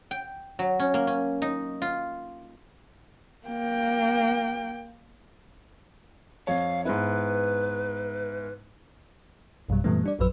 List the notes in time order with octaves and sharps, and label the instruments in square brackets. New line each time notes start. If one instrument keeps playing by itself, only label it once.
[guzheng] G5
F#3
C#4
A#3
C#4
D#4
F4
[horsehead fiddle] A#3 G5
[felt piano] F2 C#5 [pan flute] F5
[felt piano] G#2 B3 E4 [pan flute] B4
[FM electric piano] A1 F#2 B2 G3
F#2 A#2 E3 G3 A3 B3
G3 D4 D5
A#1 F#2 F3 F#3 B4 E6